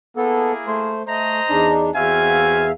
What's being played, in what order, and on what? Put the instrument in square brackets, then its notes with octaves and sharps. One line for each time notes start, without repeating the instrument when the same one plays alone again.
[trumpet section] A#3 E4 G#4 [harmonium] B3 A4
[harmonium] A3 C5
[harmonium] A3 [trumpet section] C5 D#5 A#5
[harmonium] E2 D4 D#4
[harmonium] E2 E5 F5 [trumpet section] C4 F#4 G#5